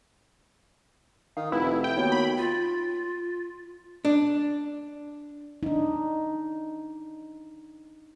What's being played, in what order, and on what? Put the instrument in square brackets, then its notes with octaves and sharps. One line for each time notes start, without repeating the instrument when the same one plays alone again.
[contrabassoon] D#3 [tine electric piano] F5
[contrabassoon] F1 [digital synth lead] E4 [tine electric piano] B4
[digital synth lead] G5
[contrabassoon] D#2 [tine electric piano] B3 F#4 C#5
[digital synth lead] B5
[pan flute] F4
[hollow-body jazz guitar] D4
[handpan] D4 D#4